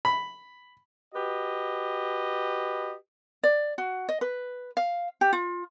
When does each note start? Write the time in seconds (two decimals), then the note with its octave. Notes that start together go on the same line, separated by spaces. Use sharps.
0.05 B5
1.14 F#4 G4 B4 D#5
3.43 D5
3.78 F#4
4.09 D#5
4.21 B4
4.77 F5
5.21 G4
5.33 F4